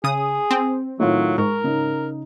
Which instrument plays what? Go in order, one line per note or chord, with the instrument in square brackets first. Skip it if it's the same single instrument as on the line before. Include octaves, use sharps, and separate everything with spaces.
[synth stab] C#3 D#6 [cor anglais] G#4
[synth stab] C4
[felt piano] A2 D#3 F4 [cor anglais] F#3
[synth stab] G#2 [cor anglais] A#4 [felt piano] C#6
[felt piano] C#3 D#4